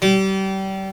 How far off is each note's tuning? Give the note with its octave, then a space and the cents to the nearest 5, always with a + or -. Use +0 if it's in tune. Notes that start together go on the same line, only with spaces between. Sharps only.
G3 -30